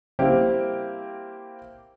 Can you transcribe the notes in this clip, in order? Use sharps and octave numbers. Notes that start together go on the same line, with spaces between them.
G3 A#3 C4 E4 G4